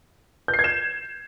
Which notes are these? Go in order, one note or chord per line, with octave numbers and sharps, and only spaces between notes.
G6
C7
G#6
E7